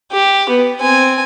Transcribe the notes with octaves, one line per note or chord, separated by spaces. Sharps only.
G4
B3
C4 G#5